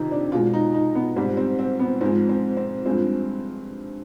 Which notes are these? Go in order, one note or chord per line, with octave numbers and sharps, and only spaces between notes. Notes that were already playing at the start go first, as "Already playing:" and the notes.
Already playing: F2 C3 D#3 D#4
D4
B2 G#3 F4
D#4
D#4
B3
G#2 G3 C4
C4
C4
B3
G#2 F3 G#3 C4
C4
C4
G2 F3 G#3 C4